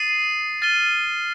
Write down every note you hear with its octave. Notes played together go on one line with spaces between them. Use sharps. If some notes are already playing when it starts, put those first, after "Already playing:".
Already playing: D#6 A6 C7 D#7
F6 A6 D#7 G7